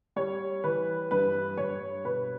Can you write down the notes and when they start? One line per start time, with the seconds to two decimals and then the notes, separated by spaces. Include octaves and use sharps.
0.16 G3 C#5
0.64 E3 B4
1.11 G2 B4
1.57 G2 C#5
2.05 B2 B4